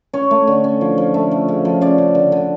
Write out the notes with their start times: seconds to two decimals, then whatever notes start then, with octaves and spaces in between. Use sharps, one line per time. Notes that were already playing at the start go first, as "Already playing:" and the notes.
0.13 C#4 C#5
0.31 A3
0.47 D3
0.64 C#4
0.81 F3
0.98 F3
1.14 A3 E5
1.31 F3
1.48 C#3
1.65 F3
1.81 C#3 D5
1.98 C#3
2.15 D3
2.32 D3